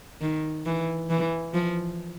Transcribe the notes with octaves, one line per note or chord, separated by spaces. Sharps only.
D#3
E3
E3
F3